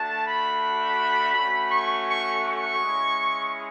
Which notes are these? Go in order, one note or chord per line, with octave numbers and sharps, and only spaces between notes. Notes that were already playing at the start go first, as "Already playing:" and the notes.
Already playing: A3 D4 F#4 A5
B5
A3 C#4 F#4
C#6
C#6
C#6
G#3 C#4 E4